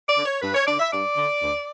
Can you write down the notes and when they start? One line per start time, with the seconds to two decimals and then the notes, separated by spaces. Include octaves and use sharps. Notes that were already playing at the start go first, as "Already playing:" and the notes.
0.09 D5
0.17 D3
0.26 C#5
0.42 G2 B4
0.55 C#5
0.67 D3 D5
0.80 E5
0.92 G2 D5
1.17 D3
1.42 D2